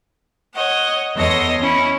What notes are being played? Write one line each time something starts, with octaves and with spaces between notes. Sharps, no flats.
C#5 D#5 F#5
E2 A4 C#5 D#5 C6 A#6
C#4 E4